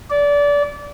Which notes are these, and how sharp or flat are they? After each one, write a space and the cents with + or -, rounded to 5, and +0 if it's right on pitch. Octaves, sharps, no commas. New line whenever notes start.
D5 -25